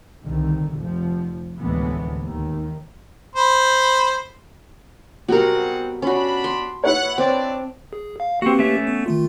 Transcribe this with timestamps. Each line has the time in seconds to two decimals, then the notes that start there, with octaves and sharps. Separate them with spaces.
0.24 C2 D3 D#3
0.78 F1 F3
1.59 D2 A2 C3 E3 G#3 B3
2.19 D#2 D#3
3.36 C5 B5
5.28 B2 F#3 G3 C4 F#4 G#4 A#4 F#5
6.02 C#4 D4 F#4 B5
6.44 C6
6.84 E4 B4 C#5 F#5
7.18 C4 D4 D5
7.93 G#4
8.20 F5
8.42 A#3 C4 F#4 G4 B4
8.59 A3 C#4 E5
8.87 B3
9.06 D#3 A3 F4